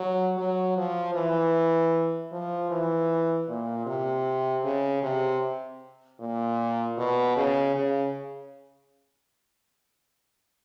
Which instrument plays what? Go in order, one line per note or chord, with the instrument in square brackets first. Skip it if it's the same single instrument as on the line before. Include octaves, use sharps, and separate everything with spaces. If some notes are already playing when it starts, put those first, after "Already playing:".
Already playing: [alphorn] F#3
F#3
F3
E3
F3
E3
A#2
C3
C#3
C3
A#2
B2
C#3
C#3